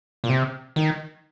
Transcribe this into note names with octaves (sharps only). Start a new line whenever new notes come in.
A#2
C3
D#3